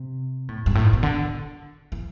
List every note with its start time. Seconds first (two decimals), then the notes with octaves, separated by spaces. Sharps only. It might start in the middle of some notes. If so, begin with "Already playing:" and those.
Already playing: C3
0.48 A2
0.66 G2
0.75 A2
0.84 G#2
0.93 B2
1.03 D3
1.92 E3